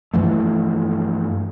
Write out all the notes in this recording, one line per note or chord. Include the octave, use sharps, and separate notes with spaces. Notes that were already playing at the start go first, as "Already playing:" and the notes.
G2 E3 F3 A3